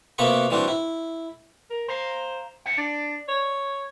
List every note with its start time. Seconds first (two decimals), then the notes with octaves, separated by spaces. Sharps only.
0.18 C3 A#3 B3 F#4 B5 C#6
0.50 E3 G3 C4 D4 F#4
0.68 E4
1.70 A#4
1.88 C5 F5 A#5
2.66 C5 E5 F#5
2.78 D4 D5
3.28 C#5